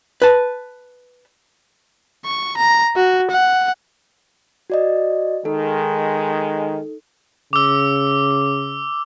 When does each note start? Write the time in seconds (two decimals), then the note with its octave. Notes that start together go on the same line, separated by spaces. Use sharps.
0.22 B4 A5
2.25 C#6
2.57 A#5
2.97 F#4
3.31 F#5
4.70 F#4 D5 D#5
5.45 D#3 G#3 D#4 A4
7.53 C#3 D6 E6